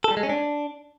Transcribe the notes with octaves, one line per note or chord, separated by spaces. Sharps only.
A4
G3
G#3
C#4
D4